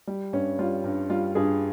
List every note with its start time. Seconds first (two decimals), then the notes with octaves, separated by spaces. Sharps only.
0.07 G3
0.33 G2 C#4
0.59 G3 F4
0.84 G2
1.10 G3 F4
1.35 G2 G#4